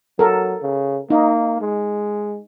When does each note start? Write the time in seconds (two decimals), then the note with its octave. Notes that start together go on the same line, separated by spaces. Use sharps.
0.19 F#3 A4 A#4
0.63 C#3
1.10 A#3 D#4
1.61 G#3